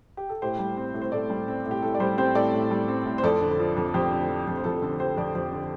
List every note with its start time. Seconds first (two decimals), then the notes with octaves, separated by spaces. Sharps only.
0.17 G4
0.29 A4
0.42 A2 G4 C5
0.59 G3
0.77 C4
0.94 A2
1.02 C5
1.12 A2 A4 D5
1.30 G3
1.48 C4
1.65 A2
1.71 G4
1.82 A2 A4
1.94 D5
2.00 G3 G4 C5
2.18 C4 G4 C5
2.35 A2 A4 D5
2.53 A2
2.71 G3
2.88 C4
3.06 A2
3.18 C5
3.23 F2 A4 D5
3.41 D3
3.59 F3
3.77 F2
3.94 F2 G4 C5
4.11 D3
4.29 F3
4.47 F2
4.57 C5
4.64 F2 A4
4.82 D3 A4
5.00 F3 G4 C5
5.17 F2 A4 D5
5.34 F2 G4 C5
5.52 D3